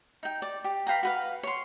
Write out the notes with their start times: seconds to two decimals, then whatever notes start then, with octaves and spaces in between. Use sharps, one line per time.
0.23 D#4 G5
0.42 D5
0.64 G4
0.87 B4 F5 G5 A#5
1.03 F#4 B4 F5
1.43 C#5 C6